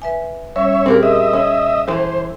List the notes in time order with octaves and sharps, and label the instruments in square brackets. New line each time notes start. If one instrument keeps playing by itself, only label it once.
[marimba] B4 E5 G#5
[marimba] G3 C#4 [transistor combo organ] C#5 E5
[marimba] A#2 G#4 [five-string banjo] C4 G4 A#4
[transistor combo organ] D#5 E5
[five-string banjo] C#4
[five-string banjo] E3 A4 [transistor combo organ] C5